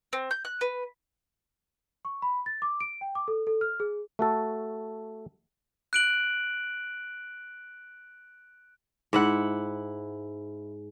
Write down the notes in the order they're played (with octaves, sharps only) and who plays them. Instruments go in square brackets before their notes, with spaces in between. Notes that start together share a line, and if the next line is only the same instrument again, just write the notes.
[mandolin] C4
G6
F#6
B4
[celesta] C#6
B5
A6
D6
D7
G5
D6
A4
A4
F6
G#4
[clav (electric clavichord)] A3 F#4 A4
[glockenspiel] F#6 D7 F#7
[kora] G#2 E4 F#5